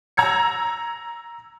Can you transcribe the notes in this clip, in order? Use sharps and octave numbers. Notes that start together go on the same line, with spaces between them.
A#5 E6 G#6 C#7